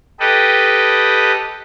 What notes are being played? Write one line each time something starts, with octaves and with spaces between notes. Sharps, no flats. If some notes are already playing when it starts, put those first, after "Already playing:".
G4 A4 B4 D#5